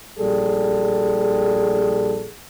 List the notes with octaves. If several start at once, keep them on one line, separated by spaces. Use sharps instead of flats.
A#1 G3 G#4 A4